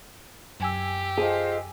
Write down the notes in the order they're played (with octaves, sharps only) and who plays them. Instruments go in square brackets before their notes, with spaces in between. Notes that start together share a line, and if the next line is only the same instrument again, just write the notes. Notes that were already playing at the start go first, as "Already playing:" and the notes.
[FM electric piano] F#2 G#5 E6 [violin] G4
[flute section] F4 C5 D#5 [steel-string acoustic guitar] G#4